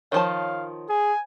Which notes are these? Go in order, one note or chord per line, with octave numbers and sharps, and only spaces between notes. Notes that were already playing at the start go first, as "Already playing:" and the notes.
D#3 F3 C#5 F5 A5 C#6
G#4 G#5